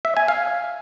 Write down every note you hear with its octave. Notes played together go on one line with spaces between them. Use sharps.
E5
G#5
F5